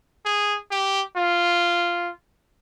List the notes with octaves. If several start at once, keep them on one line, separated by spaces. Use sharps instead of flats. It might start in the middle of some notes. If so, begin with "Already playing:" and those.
G#4
G4
F4